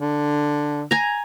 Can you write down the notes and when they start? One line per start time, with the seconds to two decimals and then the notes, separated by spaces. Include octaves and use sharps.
0.01 D3
0.91 G#5 A#5